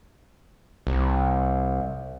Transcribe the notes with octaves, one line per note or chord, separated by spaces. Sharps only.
C2